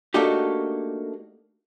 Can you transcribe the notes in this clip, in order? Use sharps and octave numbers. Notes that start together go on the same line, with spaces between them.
A3 A#3 D4 D#4 F#4 G4